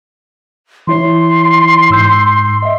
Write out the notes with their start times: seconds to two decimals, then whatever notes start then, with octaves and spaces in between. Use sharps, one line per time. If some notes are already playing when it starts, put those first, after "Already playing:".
0.87 E3 E4 C#5 C6
1.90 G#2 E6 G6
2.62 D#5 E5